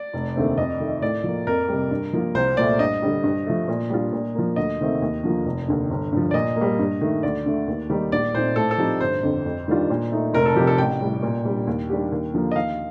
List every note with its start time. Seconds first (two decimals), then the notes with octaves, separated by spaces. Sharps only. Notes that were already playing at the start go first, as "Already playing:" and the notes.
Already playing: D5
0.13 F1
0.36 D#2 D3 A3 C4
0.58 F2 D#5
0.80 D#3 A3
1.01 A2 D5
1.24 F3 A#3
1.47 F2 A#4
1.68 C3 G3
1.91 G2
2.13 F3 A#3 F4
2.35 C2 C5
2.57 A#2 A3 D5
2.79 G2 D#5
3.02 D3 G3
3.24 G2
3.46 F3 A3
3.68 A#2
3.90 G3 D4 F4
4.13 A#2
4.35 F3 A#3
4.56 D2 D#5
4.79 C3 D#3 A3 C4
5.02 D#2
5.24 D3 F3 A#3 F4
5.45 F1
5.68 D#2 D3
5.90 G1
6.12 G2 F3
6.31 D5
6.34 A#2 D#5
6.56 A#3
6.61 G3
6.79 G2
7.01 D#3 A3
7.23 D2 D5
7.46 D3 A3
7.67 D#2
7.90 D#3 G3 A#3 D#4
8.12 A#1 D5
8.34 A#2 A3 C4 D#4 C5
8.56 A2 A4
8.71 A4
8.78 F3 C4 D#4 G4
9.00 G1 C5
9.23 F2 D3
9.46 F2
9.68 D#3 G3 D4 F4
9.90 A#2
10.11 A3 D#4
10.34 F1 A#4
10.46 A4
10.56 F2 C3 F3 G4
10.67 A4
10.78 A1 G5
11.01 A2 G3
11.23 A#2
11.45 G3 D4
11.67 D#2
11.89 D#3 G3 D4 G4
12.12 D#2
12.33 D3 F3 A#3
12.51 D#5
12.55 D#2 F5